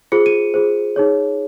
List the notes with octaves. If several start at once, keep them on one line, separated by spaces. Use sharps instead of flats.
F4 G#4 C5 C#7
D#7
F4 G#4 C5
D#4 G#4 C#5